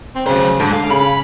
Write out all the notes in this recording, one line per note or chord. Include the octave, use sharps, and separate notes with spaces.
C4
C#3 F#3 C5
G#2 D3
D3 F5
C#3 B5